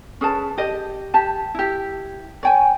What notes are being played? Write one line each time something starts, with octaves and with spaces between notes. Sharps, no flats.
C#4 G#4 B4 A5
G4 D#5
G4 A5
E4 G4
C#5 G5 G#5